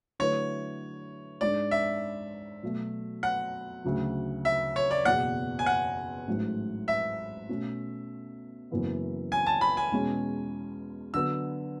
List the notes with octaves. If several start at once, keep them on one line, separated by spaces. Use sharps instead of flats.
D3 F#3 A3 E4 B4 C#5
G#2 G#3 D4 D5
E5
B2 F#3 A3
F#5
D2 C#3 F#3
E5
C#5
D5
F#1 E2 B2 F#5
G#5
F#5
A1 G#2 F#3 A3
E5
B2 A3 C#4
F#1 F#2 E3 B3 E4
G#5
A5
B5
G#5
E2 B2 G#3 C#4
D3 F#3 B3 F#4 E6